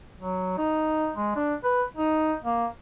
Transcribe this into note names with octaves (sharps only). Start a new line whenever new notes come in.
F#3
D#4
G#3
D4
B4
D#4
A#3